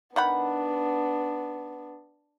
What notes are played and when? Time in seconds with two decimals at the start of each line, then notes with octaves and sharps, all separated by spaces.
0.16 D#3 B3 D4 F#5 B5